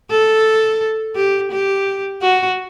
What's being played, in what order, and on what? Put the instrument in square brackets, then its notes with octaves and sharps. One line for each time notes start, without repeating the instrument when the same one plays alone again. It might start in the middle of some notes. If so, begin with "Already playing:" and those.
[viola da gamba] A4
G4
G4
F#4